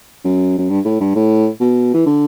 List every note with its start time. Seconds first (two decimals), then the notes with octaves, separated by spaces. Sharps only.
0.25 F#2
0.58 F#2
0.69 G2
0.85 A2
1.00 G2
1.15 A2
1.61 B2
1.94 E3
2.06 D3